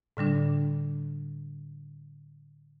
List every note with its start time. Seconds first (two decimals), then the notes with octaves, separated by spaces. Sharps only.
0.17 A2 D3 G3 D4